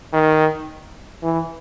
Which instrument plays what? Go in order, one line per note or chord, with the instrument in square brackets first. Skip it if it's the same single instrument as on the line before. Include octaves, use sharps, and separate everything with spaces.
[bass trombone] D#3
E3